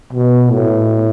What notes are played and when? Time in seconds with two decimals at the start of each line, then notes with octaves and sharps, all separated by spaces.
0.13 B2
0.51 A2